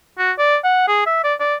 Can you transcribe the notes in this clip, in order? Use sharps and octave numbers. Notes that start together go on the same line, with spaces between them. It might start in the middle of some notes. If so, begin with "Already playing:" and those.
F#4
D5
F#5
G#4
E5
D5
D5